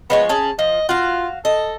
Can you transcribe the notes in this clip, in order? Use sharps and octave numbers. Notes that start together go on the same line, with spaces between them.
F3 G#3 B3 C#5
C#4 G#4 A5
F3 D#5
F4 F#4 F5
A4 D#5